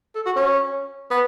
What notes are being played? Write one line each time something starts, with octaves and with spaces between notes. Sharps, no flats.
A4
F#4
C#4
B3